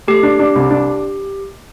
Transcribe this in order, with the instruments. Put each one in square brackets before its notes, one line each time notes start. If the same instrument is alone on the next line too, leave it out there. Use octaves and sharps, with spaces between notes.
[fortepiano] A3 [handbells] G4
[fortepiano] D4
D4
C2
D4